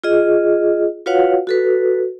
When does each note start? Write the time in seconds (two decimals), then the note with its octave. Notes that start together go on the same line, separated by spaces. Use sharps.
0.04 F4 G#4 D#5
1.06 F4 F#4 B4 C#5 F5 F#5
1.47 F#4 A4 B4